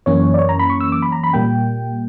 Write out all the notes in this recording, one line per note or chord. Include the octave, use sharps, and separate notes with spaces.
F#2 E3 A#3 C#4 C#5
D5
C#5
A#5
B5
C#6
E6
D6
B5
A#5
B5
A#2 G3 A#3 G5